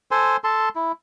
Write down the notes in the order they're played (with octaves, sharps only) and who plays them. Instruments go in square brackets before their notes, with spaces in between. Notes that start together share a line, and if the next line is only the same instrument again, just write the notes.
[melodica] A4 C5 G#5 C6
A4 A5 C6
E4